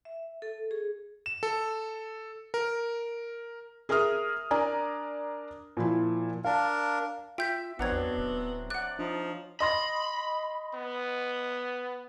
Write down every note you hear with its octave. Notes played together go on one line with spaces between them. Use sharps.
E5
A4
G#4
E7
A4
A#4
G#4 A#4 E5 D#6 F6
D4 A#4 D5 G#5 A#5
A#2 F3 E4
D4 A#4 F5 A5
F4 E5 G5 G6 B6
A1 F#3 B3 C4 D4 F#5 A#5 G#6
E2
D1
D5 F#5 F#6
F3 D4 D#4
D#5 B5 C6 A#6
B3